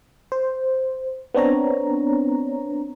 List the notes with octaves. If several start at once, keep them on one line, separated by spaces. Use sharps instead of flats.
C5
B3 C4 D4 C#5 A#5